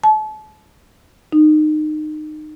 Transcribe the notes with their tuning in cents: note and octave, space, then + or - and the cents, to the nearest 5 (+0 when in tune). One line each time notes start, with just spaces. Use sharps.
A5 -35
D#4 -25